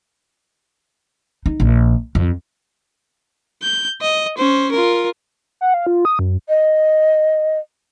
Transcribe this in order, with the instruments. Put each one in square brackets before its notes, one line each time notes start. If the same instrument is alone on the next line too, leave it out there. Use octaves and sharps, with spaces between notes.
[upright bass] D#4
A#1
F2
[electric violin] G6
D#5
C#4 C5
F4 A#4
[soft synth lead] F#5
F5
F4
D#6
F#2
[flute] D#5